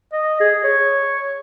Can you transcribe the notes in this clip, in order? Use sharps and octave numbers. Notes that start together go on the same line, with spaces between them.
D#5
G#4
C#5